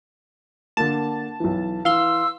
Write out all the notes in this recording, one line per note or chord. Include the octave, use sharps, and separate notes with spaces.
D3 A#3 A5
B1 E3
E3 F5 C6 E6